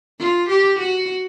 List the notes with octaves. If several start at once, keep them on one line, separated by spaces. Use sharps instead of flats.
F4
G4
F#4